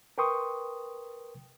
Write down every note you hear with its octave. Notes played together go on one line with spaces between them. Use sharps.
A#4 B4 G5 C6 C#6 D#6